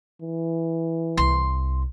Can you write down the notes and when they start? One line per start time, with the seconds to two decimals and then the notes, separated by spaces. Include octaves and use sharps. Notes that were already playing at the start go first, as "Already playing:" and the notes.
0.22 E3
1.18 C2 C6